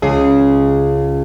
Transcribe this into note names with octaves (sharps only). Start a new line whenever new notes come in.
C#2 G#4